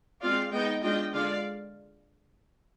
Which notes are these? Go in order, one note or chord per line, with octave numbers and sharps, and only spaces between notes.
G#3 C4 F4 D5 F5
G#3 B3 D#4 D#5 G5
G#3 D4 F4 D#5 G5
D3 G#3 D4 F4 D5 F5